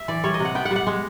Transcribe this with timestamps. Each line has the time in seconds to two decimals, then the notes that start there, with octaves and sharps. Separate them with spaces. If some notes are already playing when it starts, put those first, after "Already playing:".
Already playing: E5
0.08 E3 D5
0.24 G3 C#5
0.34 D#5
0.40 C3
0.45 F#5
0.55 B3 G5
0.65 F#5
0.71 G3
0.76 F#5
0.87 G#3